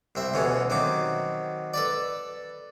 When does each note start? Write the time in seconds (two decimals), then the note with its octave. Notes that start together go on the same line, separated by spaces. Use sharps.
0.15 C2 C4 E5
0.34 D2 B2 E3 A3 C#4
0.70 D#3 F#3 C4 D6
1.74 A4 B4 D5